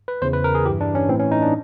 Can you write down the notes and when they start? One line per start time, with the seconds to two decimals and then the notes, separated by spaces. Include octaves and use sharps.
0.08 B4
0.22 E2 C#3 E3 C5
0.33 B4
0.44 A#4
0.55 G#4
0.66 G2 E3 G4
0.81 D4
0.95 C#4
1.09 A2 E3 C4
1.19 C#4
1.31 D#4
1.42 D4